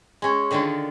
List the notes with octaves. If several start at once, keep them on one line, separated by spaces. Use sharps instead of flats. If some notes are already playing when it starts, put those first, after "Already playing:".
G#3 C#4
D3 D#3 A#3 D4 F4